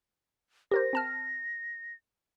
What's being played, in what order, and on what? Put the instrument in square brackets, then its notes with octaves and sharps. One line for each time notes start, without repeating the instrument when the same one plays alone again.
[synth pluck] G4 A#4 C5 [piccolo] A#6
[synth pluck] C4 A5 F6